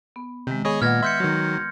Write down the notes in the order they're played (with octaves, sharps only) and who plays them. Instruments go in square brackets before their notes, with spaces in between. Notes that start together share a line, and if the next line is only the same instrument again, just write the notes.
[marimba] B3
[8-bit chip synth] C3 [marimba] D#3 G#3
[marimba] B3 [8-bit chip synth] G#4 C#5 D#5
[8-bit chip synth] A#2 [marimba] B4 D#5 F#5 [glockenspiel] F6 G#6 A#6
[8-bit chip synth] E5 [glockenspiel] C6 G6 C#7
[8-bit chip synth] D#3 F#3